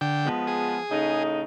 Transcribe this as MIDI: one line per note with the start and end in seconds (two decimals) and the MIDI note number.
0.01 0.29 50
0.01 0.29 79
0.25 0.77 53
0.25 0.77 56
0.25 0.77 59
0.47 1.23 68
0.90 1.42 45
0.90 1.42 49
0.90 1.42 63